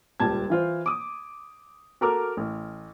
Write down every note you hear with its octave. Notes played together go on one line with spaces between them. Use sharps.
D#1 C#2 G3 A5 G#6
E3 F4 C5
D6 D#6
F#4 A4 A#4 A#5 D6 F6
A1